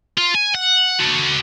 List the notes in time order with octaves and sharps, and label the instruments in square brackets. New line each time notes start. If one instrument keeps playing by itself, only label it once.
[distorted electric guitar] F4
G#5
F#5
F#4 A4